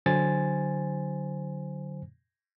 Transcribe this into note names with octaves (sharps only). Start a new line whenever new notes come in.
D3 F#3 C5 G#5 A6